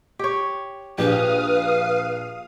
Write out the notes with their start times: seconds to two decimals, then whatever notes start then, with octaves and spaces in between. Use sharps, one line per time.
0.19 G4 C#5
0.98 A#1 G4 B4 F5 D#6